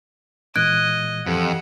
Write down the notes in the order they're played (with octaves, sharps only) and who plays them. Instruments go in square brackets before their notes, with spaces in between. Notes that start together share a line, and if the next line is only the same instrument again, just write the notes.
[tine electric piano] A#2 E3 G#3 [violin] D#5 [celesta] F#6 G#6 D7
[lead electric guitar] F2 [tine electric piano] E3 G4 A4 [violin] F#5